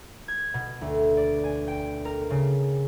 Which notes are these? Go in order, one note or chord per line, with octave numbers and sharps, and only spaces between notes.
G#6
B2
D2
D5
G#5
G5
A#4
C#3